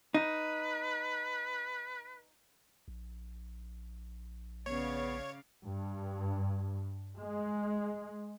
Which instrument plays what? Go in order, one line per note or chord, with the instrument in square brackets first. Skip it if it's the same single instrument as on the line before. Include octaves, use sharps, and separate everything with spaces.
[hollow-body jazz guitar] D#4 [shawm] B4
[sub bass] A#1
[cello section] C#3 D5 F5 [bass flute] B3 [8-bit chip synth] C#5
[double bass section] G2
G#3